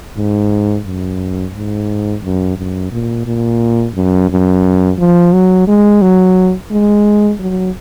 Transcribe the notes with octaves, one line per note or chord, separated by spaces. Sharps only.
G#2
F#2
G#2
F#2
F#2
A#2
A#2
F#2
F#2
F3
F#3
G#3
F#3
G#3
F#3